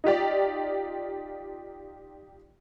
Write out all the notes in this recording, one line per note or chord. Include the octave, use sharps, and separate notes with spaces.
D#4 F4 G4 D5